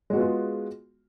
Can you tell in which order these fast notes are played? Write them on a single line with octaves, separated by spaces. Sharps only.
G#3 F#4 B3 F4 G#4